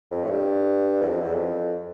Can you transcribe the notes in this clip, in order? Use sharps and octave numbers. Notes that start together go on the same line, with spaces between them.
F2
A2
G2
E2
F2
E2
F2